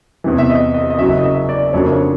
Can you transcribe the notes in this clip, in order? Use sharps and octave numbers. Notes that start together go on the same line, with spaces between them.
E2 C3 E3
E5
D#5
D#5
D#5
F#1 F#2 C#3 F#3 E5
D#5
E5
D5
F2 C#3 F#3 A#3 D4 C#5
C#5